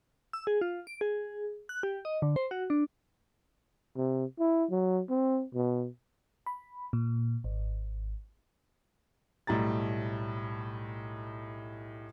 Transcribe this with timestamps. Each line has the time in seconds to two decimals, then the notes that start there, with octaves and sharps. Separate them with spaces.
0.33 E6
0.47 G#4
0.61 F4
0.87 D7
1.01 G#4
1.69 F#6
1.83 G4
2.05 D#5
2.22 D3
2.36 C5
2.51 F#4
2.70 D4
3.97 C3
4.40 E4
4.71 F#3
5.10 C4
5.55 B2
6.46 B5
6.93 A#2
7.44 G#1
9.47 B1 A2 G3 A#5 A6